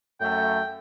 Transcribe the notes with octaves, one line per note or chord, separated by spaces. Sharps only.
F#2 A3 G5